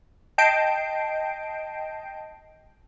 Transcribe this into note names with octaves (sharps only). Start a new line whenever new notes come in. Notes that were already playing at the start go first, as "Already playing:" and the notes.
D#5 G5 A5 G6 C7 D7